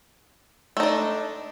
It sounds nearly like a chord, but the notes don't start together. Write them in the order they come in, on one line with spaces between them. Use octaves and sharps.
A3 D#4 D4